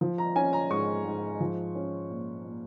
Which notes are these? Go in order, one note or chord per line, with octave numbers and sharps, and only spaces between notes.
F3
A#5
C#4 G#5
A#5
G#2 C#6
G#2
F3
C#4
A#2
A#2